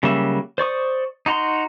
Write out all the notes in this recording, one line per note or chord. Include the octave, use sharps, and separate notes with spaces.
C#3 F#3 G3 A#3 E5
C5 D5 C#6 D#6
D#4 F#4 A#5 C6